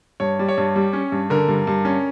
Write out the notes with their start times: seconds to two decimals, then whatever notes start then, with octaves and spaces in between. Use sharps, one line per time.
0.20 G2 C#5
0.39 G3
0.49 C#5
0.58 G2
0.76 G3
0.93 C#4
1.12 G2
1.30 D3 A#4
1.48 G2
1.67 G2
1.85 C#4